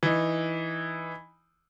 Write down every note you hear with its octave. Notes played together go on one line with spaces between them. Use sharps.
E3 D#4